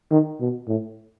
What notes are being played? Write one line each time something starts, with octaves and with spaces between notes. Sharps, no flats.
D#3
B2
A2